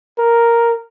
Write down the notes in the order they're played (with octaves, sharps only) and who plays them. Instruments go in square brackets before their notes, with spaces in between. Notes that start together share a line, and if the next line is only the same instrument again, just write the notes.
[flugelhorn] A#4